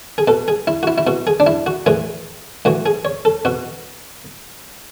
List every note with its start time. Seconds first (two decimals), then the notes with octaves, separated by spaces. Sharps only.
0.18 G#4
0.27 B2 A4
0.48 G#4
0.67 E4
0.83 F#4
0.87 E4
0.98 E4
1.07 B2 F#4
1.27 G#4
1.40 D4
1.47 E4
1.66 F#4
1.86 A2 E3 G#4
2.65 A2 E3 F#4
2.86 G#4
3.05 C#5
3.25 A4
3.45 B2 F#4